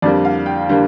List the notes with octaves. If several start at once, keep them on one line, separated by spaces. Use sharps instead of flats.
F2 D3 G3 A#3 D5
F5
G5
D3 G3 A#3